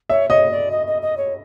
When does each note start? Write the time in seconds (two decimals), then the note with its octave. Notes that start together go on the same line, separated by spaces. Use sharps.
0.09 C#5 E5
0.30 C#5 D#5
0.51 D5
0.71 D#5
0.87 D#5
1.02 D#5
1.17 C#5